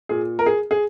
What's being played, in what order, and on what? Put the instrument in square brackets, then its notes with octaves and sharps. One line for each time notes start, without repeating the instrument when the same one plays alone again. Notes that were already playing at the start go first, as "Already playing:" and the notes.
[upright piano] A#2 G#4
A#4
G#4
G#4